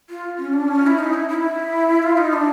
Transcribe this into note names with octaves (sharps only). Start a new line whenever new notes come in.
F4
C#4
D4
C#4
E4
D#4
E4
E4
F4
D#4
D4